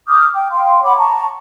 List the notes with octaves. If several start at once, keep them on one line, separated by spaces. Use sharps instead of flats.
D6 D#6 F6 G6
G5
F5 G5 C6
C#5 F#5 B5 D6
A5 A#5 C#6